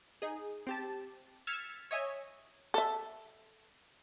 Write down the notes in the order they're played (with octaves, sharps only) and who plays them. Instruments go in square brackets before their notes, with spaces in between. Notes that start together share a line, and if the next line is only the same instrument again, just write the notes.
[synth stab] D#4 G#4
C4 G4 A5
E6 F6 G#6 A6 B6 C#7
C#5 D#5 E5 G#5
[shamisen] A4 E5